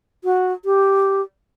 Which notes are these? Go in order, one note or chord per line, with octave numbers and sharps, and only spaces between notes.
F#4
G4